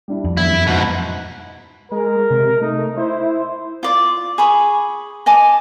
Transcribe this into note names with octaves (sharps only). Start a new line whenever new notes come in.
G3 D4 E4
F2
E2 E4
F#2 D7
G#2 B2
G#3 A#4
C3
A3 D#4
E4 C5
F4 D5 D6
G#4 B5 C#6 D#6
D#5 G#5 A5 D6